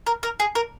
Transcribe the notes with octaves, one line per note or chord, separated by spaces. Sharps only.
A#4
A#4
G#4
A#4